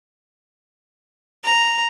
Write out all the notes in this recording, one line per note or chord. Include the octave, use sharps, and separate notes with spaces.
A#5